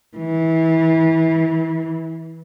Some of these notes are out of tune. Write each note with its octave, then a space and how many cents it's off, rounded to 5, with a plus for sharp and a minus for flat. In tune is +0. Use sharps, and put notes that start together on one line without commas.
E3 -25